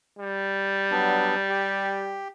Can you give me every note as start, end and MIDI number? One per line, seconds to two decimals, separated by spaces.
0.19 2.21 55
0.91 1.35 54
0.91 1.35 59
0.91 1.35 62
1.49 2.28 67